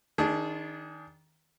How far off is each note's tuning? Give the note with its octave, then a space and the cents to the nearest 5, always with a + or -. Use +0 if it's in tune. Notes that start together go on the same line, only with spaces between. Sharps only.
D#3 +15 D4 -15 G#4 +0